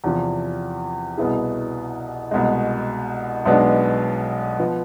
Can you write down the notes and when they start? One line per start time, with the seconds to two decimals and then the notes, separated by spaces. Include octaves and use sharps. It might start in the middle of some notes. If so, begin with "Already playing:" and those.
0.04 E2 C3 F3
1.18 C2 B2 B3 E4 G#4
2.31 C2 B2 G#3
3.45 B1 B2 G#3 B3 D4
4.59 F3 B3